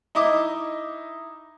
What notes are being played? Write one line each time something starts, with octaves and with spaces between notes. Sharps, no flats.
D#4 E4 D#5 D6